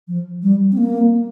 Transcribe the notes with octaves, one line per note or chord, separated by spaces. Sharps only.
F3
G3
C4
A#3